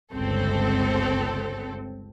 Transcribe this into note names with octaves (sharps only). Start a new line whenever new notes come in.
G1 C#2 C4 A4